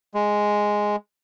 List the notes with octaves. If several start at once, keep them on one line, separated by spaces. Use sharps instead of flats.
G#3